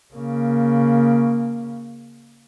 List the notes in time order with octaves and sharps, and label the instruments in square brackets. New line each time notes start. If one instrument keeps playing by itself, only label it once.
[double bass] C#3 A#3